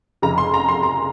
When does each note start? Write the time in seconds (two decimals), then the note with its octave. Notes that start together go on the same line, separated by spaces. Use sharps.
0.22 F1 F2 C#3 A#5
0.38 C6
0.54 A#5
0.69 C6
0.83 A#5